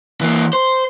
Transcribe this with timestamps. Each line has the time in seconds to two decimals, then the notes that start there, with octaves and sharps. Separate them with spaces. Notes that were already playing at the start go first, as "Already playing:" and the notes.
0.21 E3 A#3
0.53 C5